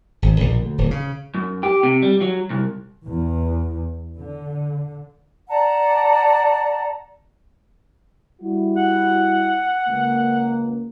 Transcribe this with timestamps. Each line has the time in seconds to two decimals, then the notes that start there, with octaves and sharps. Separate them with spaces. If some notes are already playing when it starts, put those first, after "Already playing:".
0.22 G#1
0.40 A#1
0.62 D2
0.78 D1
0.91 C#3
1.35 F#2
1.63 G4
1.83 C3
2.02 G3
2.21 F#3
2.50 C2
3.06 E2
4.20 D3
5.49 D5 F#5 A5 A#5
8.41 G3 E4 F#4
8.77 F#5
9.88 C#2 A#3